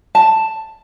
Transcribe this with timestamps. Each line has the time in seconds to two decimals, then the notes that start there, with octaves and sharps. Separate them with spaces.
0.15 A5